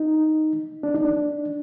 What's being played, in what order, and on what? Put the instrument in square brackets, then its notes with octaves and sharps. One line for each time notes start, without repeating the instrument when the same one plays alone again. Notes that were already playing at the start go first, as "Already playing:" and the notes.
Already playing: [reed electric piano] D#4
D4
D#4
D4